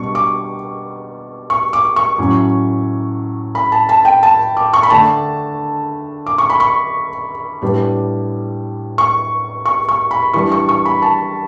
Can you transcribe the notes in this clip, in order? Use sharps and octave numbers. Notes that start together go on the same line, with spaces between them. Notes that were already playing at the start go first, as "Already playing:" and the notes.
Already playing: B2 G3 D4 C#6
D6
C#6
D6
C#6
A2 F#3 C#4
B5
A5
A5
G5
A5
D6
C#6
B5
D3 A3 D4 A5
D6
C#6
B5
C#6
A2 G3 B3 D4
C#6
C#6
C#6
B5
E3 G3 D4 C#6
C#6
C#6
B5
A5